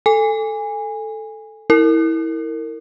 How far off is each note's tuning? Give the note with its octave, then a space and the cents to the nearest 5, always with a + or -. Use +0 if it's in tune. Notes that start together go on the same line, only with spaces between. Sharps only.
A4 +0 G#5 -20
E4 -20 A#4 -25